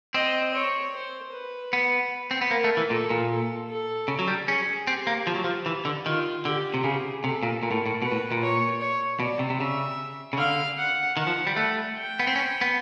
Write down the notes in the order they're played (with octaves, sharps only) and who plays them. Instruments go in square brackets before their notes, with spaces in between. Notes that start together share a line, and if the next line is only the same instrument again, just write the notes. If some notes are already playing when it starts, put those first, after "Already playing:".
[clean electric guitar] C4 [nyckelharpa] D#5
[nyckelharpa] C#5
C5
B4
[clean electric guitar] B3
C4
B3
[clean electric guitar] A#3 [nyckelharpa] A#4
[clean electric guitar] A3
E3
[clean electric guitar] A#2 [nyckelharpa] A4
[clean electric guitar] A#2
[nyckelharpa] A4
A4
[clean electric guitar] C#3
F#3
G3
[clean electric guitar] C#4 [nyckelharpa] G#4
[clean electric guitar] C4 [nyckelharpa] G4
[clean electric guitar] A#3
F3
F#3
F3
E3
D3
[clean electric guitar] D#3 [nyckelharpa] F4
[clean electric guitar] D3 [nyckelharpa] G4
[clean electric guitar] C3
[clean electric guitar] C#3 [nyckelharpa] G#4
[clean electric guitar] C3 [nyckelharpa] A4
[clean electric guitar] A#2
[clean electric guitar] A#2 [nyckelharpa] A#4
[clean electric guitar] A2
A2
[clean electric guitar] B2 [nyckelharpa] B4
[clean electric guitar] A2
A#2
[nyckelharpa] C#5
C#5
[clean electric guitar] B2 [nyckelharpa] D5
[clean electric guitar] C3
C3
[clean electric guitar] C#3 [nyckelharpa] E5
[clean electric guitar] C#3
[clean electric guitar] D3 [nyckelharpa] F5
[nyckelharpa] F#5
[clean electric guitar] D#3 [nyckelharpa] F#5
[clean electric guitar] F3
G3
[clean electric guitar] A3 [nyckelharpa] F#5
[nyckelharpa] G5
[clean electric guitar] B3
C4
C#4
B3